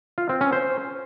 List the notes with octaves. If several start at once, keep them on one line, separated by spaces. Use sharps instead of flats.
F4
C4
C#4
C5